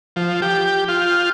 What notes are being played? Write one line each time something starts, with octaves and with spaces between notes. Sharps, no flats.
F3
G4
F4